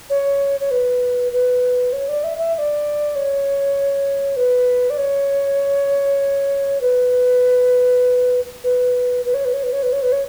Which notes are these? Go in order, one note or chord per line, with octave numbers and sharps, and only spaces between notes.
C#5
C#5
B4
B4
C#5
D5
E5
E5
E5
D5
C#5
B4
D5
C#5
B4
B4
B4
C#5
B4
C#5
B4
C#5
B4
C#5
B4
C#5